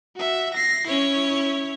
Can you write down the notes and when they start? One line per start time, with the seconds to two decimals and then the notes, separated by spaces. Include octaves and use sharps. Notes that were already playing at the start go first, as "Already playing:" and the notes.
0.16 F#4 E5
0.54 A#6 C7
0.87 C#4 E4 C#5